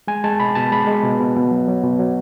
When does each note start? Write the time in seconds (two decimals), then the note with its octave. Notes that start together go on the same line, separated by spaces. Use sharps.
0.07 G#3 G#5
0.24 G#3 A5
0.39 B2 B5
0.55 B2 A5
0.71 G#3 B5
0.87 G#3
1.03 B2
1.19 B2
1.36 B2
1.51 F#3
1.68 F#3
1.83 B2
1.99 F#3